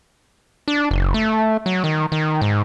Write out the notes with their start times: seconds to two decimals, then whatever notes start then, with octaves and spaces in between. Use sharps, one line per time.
0.68 D4
0.91 F#1
1.14 A3
1.66 F#3
1.84 D#3
2.12 D#3
2.41 G#2